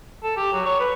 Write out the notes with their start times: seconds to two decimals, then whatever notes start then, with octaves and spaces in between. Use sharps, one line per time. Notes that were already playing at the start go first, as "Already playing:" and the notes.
0.23 A4
0.37 G4
0.53 F#3
0.66 C#5
0.80 B4